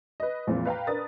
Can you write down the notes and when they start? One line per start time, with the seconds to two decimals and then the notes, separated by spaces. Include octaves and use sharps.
0.20 B4 D#5
0.47 F2 A#2 E3 G#3 C4
0.65 B4 F5 G5 A#5
0.87 D4 A#4 B4 D#6 A6